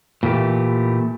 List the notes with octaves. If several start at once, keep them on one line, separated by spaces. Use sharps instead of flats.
A#2 E3 A3 G4